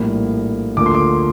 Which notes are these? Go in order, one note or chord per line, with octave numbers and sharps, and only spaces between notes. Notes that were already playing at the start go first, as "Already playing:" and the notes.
Already playing: A#1 A2 G3 A#3
D2 D3 F3 A#3 D6
C6
D6